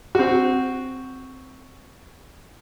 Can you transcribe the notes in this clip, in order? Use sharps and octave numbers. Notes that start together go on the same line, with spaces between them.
C4 F#4